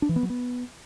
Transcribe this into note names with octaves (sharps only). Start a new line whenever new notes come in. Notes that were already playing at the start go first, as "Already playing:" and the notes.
D4
E3
B3
F#3
B3